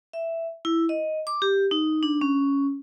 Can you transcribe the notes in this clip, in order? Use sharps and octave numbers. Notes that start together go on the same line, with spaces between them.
E5
E4
D#5
D6
G4
D#4
D4
C#4